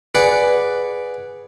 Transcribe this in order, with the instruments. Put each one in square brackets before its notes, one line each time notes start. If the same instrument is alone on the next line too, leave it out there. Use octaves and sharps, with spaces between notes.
[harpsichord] G#4 B4 D5 F#5